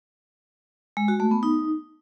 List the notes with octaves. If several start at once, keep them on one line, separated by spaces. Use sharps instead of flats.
G#3
F#4
A3
B3
D#4